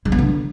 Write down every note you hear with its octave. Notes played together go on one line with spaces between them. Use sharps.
G#3
B3
D3